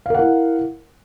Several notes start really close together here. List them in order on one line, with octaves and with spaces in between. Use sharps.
F5 A#4 F#5 E4